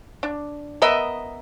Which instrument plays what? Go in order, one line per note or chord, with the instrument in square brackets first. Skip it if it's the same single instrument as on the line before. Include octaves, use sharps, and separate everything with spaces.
[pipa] D4
B3 A#4 D#5 E5